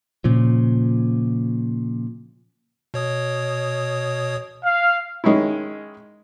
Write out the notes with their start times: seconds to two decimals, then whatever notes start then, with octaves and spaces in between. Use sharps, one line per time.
0.24 A#2 C#3 F3
2.94 B2 C#5 D#6
4.65 F5
5.24 D#3 G#3 C#4 D#4 E4